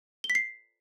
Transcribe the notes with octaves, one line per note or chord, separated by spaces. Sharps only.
G7
B6
C7